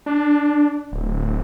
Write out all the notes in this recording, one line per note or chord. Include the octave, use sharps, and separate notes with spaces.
D4
D1